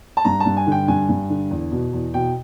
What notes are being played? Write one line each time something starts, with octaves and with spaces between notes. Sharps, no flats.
A5
G2 A#5
A5
G2
G#5
D3 G5
G2 G#5
G2
D3
E2
B2
E2
B2 G5